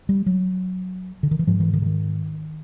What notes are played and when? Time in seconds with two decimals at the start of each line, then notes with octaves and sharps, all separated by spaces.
0.09 G3
0.26 F#3
1.23 D3
1.31 D#3
1.39 E3
1.47 G#2 F3
1.60 E3
1.73 D#3
1.82 D3
1.86 D#3